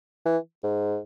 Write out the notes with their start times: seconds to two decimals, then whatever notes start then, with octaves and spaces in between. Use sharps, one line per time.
0.26 E3
0.64 G#2